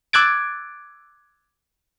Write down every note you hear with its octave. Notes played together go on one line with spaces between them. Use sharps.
D6 E6 F#6 G#6 A6 D7